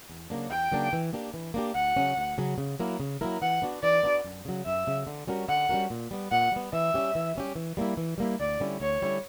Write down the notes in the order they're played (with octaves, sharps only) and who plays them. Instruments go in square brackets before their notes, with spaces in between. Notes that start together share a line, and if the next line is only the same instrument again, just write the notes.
[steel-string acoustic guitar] E2
C#3 F#3 A#3 D4
[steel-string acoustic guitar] E2 [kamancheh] G5
[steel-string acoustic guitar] C#3 F#3 A#3 D4
E3
A#3 D4 G4
E3
A#3 D4 G4
[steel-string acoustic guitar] D2 [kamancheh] F#5
[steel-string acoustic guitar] C#3 F#3 C#4
D2
C#3 F#3 C#4
C#3
F#3 A#3 E4 A#4
C#3
F#3 A#3 E4 A#4
[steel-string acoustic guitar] E3 [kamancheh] F#5
[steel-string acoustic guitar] B3 D4 F#4
[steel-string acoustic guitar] E3 [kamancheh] D5
[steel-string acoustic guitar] B3 D4 F#4
F#2
C#3 F#3
[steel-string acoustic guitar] F#2 [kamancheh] E5
[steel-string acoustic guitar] C#3 F#3
D3
G3 C#4 F#4 A#4
[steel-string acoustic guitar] D3 [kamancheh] F#5
[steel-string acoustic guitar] G3 C#4 F#4 A#4
A#2
G3 B3
[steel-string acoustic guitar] A#2 [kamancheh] F#5
[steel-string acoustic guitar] G3 B3
[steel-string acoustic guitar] E3 [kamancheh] E5
[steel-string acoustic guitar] G3 C#4 G4
E3
G3 C#4 G4
E3
G3 A#3 E4
E3
G3 A#3 E4
[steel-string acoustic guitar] D2 [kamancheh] D5
[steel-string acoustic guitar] D3 G3 C#4 E4
[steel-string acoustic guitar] D2 [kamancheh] C#5
[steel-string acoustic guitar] D3 G3 C#4 E4